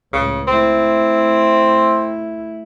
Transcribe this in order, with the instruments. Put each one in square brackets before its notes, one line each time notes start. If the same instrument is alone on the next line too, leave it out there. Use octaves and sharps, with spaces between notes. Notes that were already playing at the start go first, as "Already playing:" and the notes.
[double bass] C#2 A2 [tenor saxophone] C#3
[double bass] A3 E4 [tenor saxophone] C4